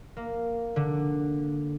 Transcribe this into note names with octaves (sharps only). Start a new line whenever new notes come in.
A#3
D3